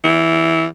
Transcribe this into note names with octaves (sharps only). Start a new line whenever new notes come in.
E3